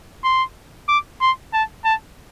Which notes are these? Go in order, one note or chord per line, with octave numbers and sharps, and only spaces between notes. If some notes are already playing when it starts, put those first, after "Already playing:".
C6
D6
C6
A5
A5